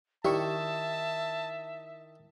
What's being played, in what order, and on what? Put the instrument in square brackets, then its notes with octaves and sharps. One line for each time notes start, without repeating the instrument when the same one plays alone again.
[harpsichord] D#3 E4 [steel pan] G4 D5 C#6 [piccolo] E5 [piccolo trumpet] A5